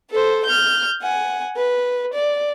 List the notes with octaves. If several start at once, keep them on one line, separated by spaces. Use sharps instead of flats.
A4 C5
F6 G6
F#5 G#5
B4
D5